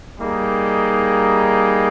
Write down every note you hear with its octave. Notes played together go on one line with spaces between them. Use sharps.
G3 A#3 D#4 G#4